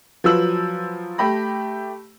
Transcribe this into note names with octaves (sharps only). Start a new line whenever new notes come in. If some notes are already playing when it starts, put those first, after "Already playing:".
F3 F#3 B4 E6 F#7
A3 G4 B5 A#6